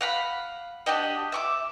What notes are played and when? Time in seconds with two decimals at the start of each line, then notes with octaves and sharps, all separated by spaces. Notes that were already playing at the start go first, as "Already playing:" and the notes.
0.01 F5 F#5 B5
0.86 D4 F#4 G4 D#5
1.32 E5 C#6 D6